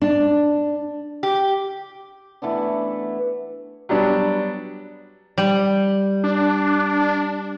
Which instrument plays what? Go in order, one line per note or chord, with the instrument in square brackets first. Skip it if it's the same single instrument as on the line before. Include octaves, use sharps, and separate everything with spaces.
[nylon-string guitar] D4
[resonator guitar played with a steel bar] G4
[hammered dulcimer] E3 A3 B3 D4
[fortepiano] F#3 G3 B3 D4
[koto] G3
[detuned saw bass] D4